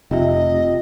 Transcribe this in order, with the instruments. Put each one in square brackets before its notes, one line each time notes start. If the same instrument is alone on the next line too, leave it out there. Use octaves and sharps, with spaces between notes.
[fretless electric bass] F1 [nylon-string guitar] C3 [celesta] F4 E5 [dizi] D#5